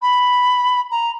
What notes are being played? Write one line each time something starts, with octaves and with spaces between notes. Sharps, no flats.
B5
A#5